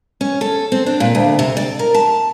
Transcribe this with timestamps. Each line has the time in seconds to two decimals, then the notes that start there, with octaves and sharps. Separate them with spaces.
0.21 C#4
0.41 A4
0.72 C4
0.86 D4
1.00 A#2
1.15 D2
1.39 C3
1.57 D5
1.79 A#4
1.94 A5